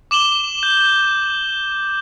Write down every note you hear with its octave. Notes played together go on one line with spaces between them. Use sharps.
D6 E7 F#7 G7
G6